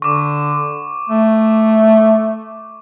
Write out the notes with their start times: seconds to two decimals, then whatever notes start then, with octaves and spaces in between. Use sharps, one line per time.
0.02 D3 C#6 D6
1.09 A3